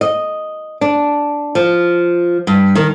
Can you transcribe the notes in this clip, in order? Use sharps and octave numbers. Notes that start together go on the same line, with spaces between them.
D#5
D4
F3
G2
D#3